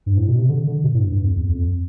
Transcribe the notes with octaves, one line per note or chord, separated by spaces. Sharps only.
G2
A2
B2
C3
D3
D3
B2
A2
G2
G2
F2
E2
F2